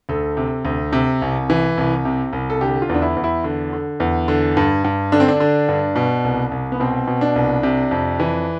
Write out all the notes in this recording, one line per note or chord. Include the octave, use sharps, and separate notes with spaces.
D2 A4
C3
D2
C3
C2
E3
C2
C3
C2
A4
D3 G4
F4
E2
D4
E4
E2
E4
D3
D3
E2
D3
G2
G2
D3 D4
C4
D4
D3
G2
B2
C2
C2
B3
B2 C4
B2
D4
C2
C3
F2
E3